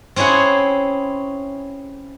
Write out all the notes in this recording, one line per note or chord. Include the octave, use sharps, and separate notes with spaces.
C4 C#4 E4 G#4 F#5